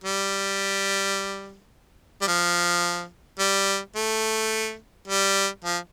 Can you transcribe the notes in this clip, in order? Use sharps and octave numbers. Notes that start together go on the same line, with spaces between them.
G3
G3
F3
G3
A3
G3
F3